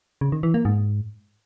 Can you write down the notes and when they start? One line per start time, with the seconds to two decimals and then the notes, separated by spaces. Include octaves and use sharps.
0.21 C#3
0.32 D#3
0.43 E3
0.54 A#3
0.65 G#2